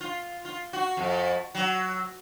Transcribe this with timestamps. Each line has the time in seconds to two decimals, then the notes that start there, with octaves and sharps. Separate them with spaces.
0.01 F4
0.45 F4
0.73 F#4
0.97 F2
1.55 F#3